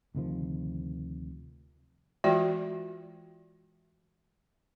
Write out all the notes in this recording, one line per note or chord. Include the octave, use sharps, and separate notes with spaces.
D2 C3 D#3 F3
E3 G#3 F4 F#4 D5 G5